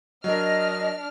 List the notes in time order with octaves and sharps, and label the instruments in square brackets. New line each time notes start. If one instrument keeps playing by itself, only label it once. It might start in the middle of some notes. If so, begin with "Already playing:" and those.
[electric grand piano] F#3 A#4 [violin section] D4 F6 [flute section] D#5